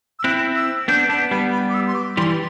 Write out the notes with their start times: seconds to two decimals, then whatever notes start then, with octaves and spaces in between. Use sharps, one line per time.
0.19 E6
0.24 C4 E4 F#6
0.56 E6
0.88 B3 D4 G6
1.09 B3 D4 A5
1.31 G3 B3 B5
1.52 B5
1.69 D6
1.74 E6
1.87 C6
1.95 D6
2.17 E3 G3 C6